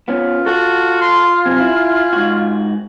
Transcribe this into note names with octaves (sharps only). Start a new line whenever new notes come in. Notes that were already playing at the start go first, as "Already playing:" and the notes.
B3 C#4 F4
F#4 A4 F#5
C6
F#2 C3 C4 G#5
E4
G#2 F#4